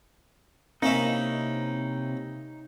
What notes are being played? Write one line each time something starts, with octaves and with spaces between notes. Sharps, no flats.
C3 A#3 C4 C#4 D#4 E4